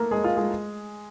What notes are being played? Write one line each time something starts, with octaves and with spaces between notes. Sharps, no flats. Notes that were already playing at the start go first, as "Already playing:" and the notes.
Already playing: A3 A#3 A4 A#4
G#3 G#4
F4
G#3 G#4